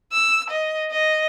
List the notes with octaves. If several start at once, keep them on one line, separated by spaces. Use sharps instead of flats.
E6
D#5
D#5